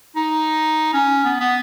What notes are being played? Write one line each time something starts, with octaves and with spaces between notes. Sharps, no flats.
D#4
C#4
B3
B3